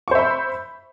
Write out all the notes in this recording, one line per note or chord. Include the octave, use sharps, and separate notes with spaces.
C5 E5 B5 C#6